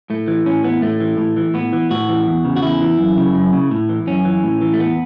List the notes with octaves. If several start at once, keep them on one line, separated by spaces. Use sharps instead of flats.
A2 A3
E3
A2 C#4
E3 B3
A2 A3
E3
A2
E3
A2 B3
E3
A2 F#4
E3
E2
C#3
F#4
E2 E4
E3
F#2
C#3
F#2
C#3
A2
E3
F#2 C#4
E3
A2
E3
A3
E2 B3